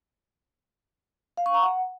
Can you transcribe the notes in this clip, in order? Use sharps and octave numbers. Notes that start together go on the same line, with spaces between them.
F5
C#6
A#5
F#5